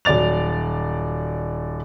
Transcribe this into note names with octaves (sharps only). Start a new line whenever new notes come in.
D#1 F#3 D5 A6 F7